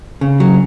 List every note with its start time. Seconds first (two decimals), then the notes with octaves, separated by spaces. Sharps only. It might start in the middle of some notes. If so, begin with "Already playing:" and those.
0.21 C#3
0.40 F#3